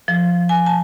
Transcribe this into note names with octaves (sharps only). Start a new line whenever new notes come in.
F3
G#5
A5